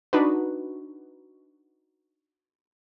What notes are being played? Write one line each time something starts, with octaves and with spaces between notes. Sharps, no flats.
D4 D#4 F#4 B4